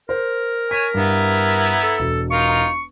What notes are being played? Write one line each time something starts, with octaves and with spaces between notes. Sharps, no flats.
A#4 C5
C#5 G#5 B6
G2 B3 E4 A#5
A4 E6
E1
D#4 F4 A#4 C#6